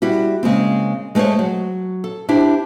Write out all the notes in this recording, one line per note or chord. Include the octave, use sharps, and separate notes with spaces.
G3 E4 F#4
C#3 G#3 A#3 C4
G#3 A3 A#4 C5 C#5
F#3
A4
D4 E4 G4 C5